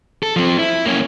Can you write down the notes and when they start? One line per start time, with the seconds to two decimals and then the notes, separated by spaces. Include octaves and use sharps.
0.23 A4
0.36 F3 C4
0.59 E4
0.86 A#3 C#4